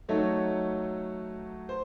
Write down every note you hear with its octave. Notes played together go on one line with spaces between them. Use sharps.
F#3 A3 D#4 A4 C#5
C5